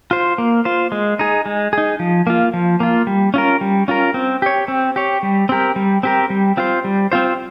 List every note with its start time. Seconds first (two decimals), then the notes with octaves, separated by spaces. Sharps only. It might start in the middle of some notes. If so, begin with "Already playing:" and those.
0.11 F4 C5
0.38 A#3
0.65 F4 C5
0.92 G#3
1.19 D#4 G#4
1.46 G#3
1.73 D#4 G#4
1.99 F3
2.27 A#3 F4
2.54 F3
2.80 A#3 F4
3.07 G3
3.34 C#4 F4 A#4
3.61 G3
3.88 C#4 F4 A#4
4.14 C4
4.42 G4 C#5
4.68 C4
4.96 G4 C#5
5.23 G3
5.49 C4 G4 A#4
5.76 G3
6.03 C4 G4 A#4
6.30 G3
6.57 C4 F4 C5
6.84 G3
7.12 C4 F4 C5